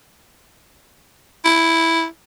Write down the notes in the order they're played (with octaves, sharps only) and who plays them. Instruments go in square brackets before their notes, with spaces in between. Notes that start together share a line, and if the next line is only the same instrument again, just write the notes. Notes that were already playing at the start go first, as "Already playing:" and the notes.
[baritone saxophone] E4